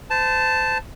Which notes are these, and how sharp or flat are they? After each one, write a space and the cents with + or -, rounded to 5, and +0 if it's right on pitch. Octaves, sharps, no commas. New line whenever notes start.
C5 -35 A5 +0